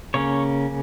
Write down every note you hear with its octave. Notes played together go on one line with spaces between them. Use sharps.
C#3 A#3 C#4 C#5